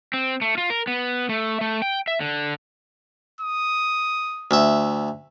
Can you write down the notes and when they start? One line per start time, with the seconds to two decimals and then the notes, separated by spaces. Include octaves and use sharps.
0.13 C4
0.41 A3
0.58 F4
0.70 A#4
0.87 B3
1.29 A3
1.61 A3
1.82 G5
2.08 E5
2.20 D3
3.41 D#6
4.51 D2 E5